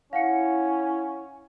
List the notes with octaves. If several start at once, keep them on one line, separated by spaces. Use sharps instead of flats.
C#4 E4 F5 F#5 C#7